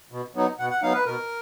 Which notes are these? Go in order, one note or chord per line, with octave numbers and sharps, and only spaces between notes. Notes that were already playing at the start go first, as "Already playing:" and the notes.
B2
F#3 B3 D#4
B2 F#5
F#5
F#3 B3 D#4 F5
B4
B2 A#4